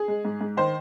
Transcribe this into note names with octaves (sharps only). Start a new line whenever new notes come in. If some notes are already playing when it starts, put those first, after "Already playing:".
Already playing: G#4
G#3
G#2
G#2
D#3 C5